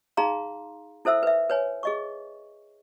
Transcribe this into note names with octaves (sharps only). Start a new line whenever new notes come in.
D#4 G#4 F5 A#5 C6
E4 A4 C5 E5 E6
B4 E5
B4 C#5 G#5
G#4 D#5 C#6